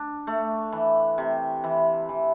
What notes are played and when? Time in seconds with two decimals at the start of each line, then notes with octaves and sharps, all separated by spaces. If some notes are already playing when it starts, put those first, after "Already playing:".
Already playing: D4
0.27 A3
0.72 E3
1.18 C3
1.64 E3
2.09 E3